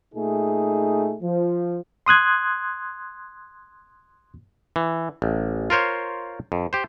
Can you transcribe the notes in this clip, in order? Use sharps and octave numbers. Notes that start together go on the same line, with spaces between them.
A#2 A3 D#4 G#4
F3
C6 D#6 F#6 G#6
E3
A1
F4 A#4 C5 C#5
F2
G4 C5